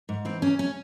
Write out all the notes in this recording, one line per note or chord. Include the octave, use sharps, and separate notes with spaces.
G#2
E3 C4
E2 C#4
C#4